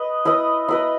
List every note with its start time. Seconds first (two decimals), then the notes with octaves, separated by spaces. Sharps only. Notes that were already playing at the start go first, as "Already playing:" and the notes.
Already playing: B4 D#5
0.25 E4 B4 D#5
0.69 E4 B4 D#5